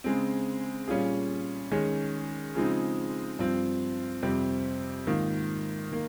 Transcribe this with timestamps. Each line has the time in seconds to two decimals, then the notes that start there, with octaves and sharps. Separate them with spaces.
0.04 C#3 G#3 C4
0.88 A#2 G3 C#4 F4 G#4
1.71 D#3 G#3 C#4 G#4
2.55 C#3 F3 G#3 C4 D#4
3.39 G2 F3 C4
4.22 F2 C3 G3 C4 G4
5.07 G#2 D#3 A#3 F4
5.92 D#3 A#3